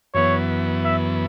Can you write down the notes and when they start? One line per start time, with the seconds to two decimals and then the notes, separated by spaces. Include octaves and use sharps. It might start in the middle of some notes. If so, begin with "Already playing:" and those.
0.15 F#2 E3 B3 C#5
0.85 E5